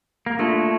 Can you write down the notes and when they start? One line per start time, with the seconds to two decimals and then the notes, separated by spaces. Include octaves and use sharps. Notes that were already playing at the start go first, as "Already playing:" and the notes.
0.26 A#3
0.39 A3 A#3 D4 F4